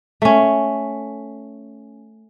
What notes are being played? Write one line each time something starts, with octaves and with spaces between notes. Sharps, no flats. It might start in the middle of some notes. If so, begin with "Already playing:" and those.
A3 C#4